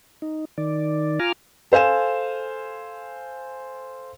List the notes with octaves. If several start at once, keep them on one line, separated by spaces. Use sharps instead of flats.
D#4
D#3 D5
F4 G#5 A#5 D6 F6
A4 C5 F5 G#5 E7